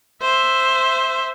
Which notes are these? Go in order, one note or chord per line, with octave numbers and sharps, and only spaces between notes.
C5 E5